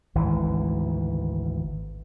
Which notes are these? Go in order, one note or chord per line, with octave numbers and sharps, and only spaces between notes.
G#1 D2 E3